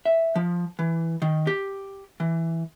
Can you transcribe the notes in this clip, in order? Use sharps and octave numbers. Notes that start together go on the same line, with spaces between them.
E5
F3
E3
D#3
G4
E3